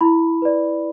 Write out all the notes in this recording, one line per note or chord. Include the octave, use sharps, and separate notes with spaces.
E4 B5
B4 D5